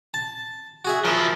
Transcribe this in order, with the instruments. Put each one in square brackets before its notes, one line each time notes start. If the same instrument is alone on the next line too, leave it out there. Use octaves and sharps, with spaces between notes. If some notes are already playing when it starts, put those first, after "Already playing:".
[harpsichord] A5
F#4 G#4 E5
[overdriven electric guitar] F3 E4 [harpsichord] A#4